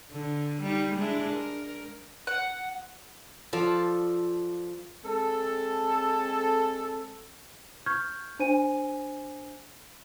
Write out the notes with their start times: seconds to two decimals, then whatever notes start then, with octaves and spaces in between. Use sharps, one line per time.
0.12 D3
0.62 G3 D#4
0.95 G#3 D4 E4
1.33 A#4
2.27 F#5
3.53 F3 F4 A4 D5
5.04 G#3 C4 A4
7.86 C#6 F6 G6 G#6
8.39 D4 C5 G#5 D#7